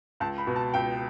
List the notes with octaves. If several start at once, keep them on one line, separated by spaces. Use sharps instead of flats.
C#2 A5
B5
B2
A5
C#2 G5